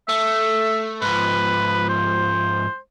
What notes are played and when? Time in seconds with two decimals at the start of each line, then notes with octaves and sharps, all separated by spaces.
0.09 A3 E5
1.02 G#2 F3 B4
1.89 C5